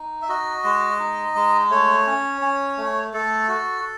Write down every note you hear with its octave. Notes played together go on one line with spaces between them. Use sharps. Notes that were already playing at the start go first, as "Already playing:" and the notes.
Already playing: D#4
E5
F#4 D#5
G#3
D#4
G#3
A3 C#5
C#4
C#4
A3
A3 A4
F#4